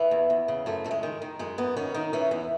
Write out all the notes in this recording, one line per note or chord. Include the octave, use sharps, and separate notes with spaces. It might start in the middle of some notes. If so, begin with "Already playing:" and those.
Already playing: E3 B3
E2
E2
C#3
F#2 A3
F#2 A3
G#3
D#3
D#3
F#2 G#3
F#2 B3
D#3 C#4
D#3 D#4
E3 C#4
E2 B3